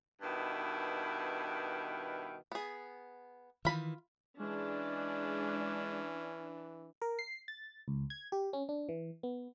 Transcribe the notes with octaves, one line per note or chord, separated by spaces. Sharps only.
G2 B2 D#3 E4
B3 G#4
D#3 E3 F4 B5
E3 G#3 C#4 D4
A#4
C7
A6
C#2
G#6
G4
C#4
D4
E3
B3